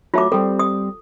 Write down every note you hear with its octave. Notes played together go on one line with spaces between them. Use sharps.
F#3 A3 F4 D6
G3 C4 A4
D#6